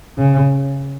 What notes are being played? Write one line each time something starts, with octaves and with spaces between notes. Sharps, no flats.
C#3